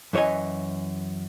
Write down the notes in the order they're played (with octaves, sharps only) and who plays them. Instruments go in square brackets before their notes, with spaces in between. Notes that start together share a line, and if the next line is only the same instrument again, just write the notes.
[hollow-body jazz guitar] F#2 E3 C#5 D#5 G#5